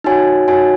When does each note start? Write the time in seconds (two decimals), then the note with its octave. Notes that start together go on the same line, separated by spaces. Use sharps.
0.04 D#4 F#4 C#5 G#5
0.48 D#4 F#4 C#5 G#5